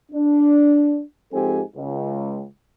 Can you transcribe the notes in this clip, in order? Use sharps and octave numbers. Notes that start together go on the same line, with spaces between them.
D4
G#2 F3 C4 G4 A4 G#5
C#2